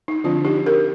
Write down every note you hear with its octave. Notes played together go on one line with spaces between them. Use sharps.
D#4
D3 F3 C4 D4 F4
D#4 G4
G4 A#4